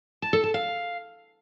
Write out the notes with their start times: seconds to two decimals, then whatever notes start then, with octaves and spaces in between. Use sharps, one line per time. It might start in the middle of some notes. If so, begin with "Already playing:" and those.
0.22 A5
0.33 A4
0.44 A5
0.54 F5